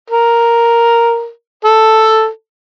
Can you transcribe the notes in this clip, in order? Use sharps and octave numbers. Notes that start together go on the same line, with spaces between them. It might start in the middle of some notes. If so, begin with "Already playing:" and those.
A#4
A4